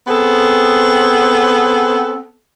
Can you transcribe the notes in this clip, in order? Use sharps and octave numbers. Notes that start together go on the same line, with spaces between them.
B3 C4 G#4 A4